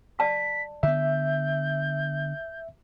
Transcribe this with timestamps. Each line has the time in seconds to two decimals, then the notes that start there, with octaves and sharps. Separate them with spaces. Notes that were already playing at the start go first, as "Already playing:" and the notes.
0.19 D5 A5 D6 B6
0.83 D3 B3 E5 G6